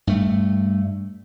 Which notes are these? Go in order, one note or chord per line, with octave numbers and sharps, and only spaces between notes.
G2 A3